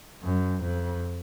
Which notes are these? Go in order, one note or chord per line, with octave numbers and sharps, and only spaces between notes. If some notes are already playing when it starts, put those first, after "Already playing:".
F#2
F2